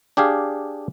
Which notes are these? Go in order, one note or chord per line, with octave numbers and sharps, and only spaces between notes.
D4 G4 G#4 F5